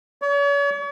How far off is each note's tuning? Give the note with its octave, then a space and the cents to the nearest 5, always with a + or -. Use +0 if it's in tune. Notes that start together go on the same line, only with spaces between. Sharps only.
C#5 +40